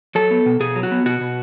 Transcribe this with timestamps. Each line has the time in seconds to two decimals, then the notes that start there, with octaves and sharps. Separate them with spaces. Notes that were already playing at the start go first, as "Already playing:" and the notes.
0.15 F#3 A4
0.31 B3
0.46 B2
0.60 B2 G#4
0.76 F#3
0.83 F#4
0.91 B3
1.06 B2 F#4
1.21 B2